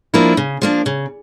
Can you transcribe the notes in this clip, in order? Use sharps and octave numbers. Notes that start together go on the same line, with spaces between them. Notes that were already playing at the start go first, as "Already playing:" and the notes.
F3 A#3 D4 E4
C#3
F3 A#3 D4
C#3